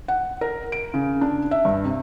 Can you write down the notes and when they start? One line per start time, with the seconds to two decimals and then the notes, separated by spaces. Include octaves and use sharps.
0.08 F#5
0.41 A#4
0.72 D7
0.94 C#3
1.21 D4
1.51 E5
1.65 G2
1.85 C3